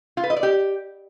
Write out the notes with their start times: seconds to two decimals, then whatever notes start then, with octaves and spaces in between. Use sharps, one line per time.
0.17 F4
0.24 B4
0.30 D#5
0.36 D5
0.43 G4